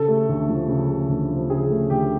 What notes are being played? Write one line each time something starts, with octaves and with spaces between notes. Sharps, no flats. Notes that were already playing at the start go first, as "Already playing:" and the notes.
Already playing: C#3 A4
A3
D2
F3
C#3
A3
D2
F3
C#3 G#4
A3
D2 G4